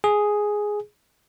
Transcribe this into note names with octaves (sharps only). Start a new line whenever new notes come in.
G#4